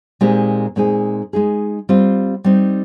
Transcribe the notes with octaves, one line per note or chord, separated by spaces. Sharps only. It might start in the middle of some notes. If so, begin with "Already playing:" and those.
A#2 G#3 C4 D#4 G4
A#2 G#3 C4 D#4 G#4
G#3 D#4 G#4
G3 C4 F4
G3 C4 D#4